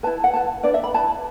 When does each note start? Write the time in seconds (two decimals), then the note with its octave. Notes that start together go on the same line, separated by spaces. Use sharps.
0.03 E4 B4 A5
0.24 F#5
0.34 E4 B4 A5
0.63 D4 B4 D5
0.74 E5
0.84 B5
0.94 E4 B4 A5